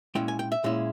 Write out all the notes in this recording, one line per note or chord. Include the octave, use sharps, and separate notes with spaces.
A#2 G#3 C#4 E4 G5
G#5
G5
E5
A#2 G#3 C#4 E4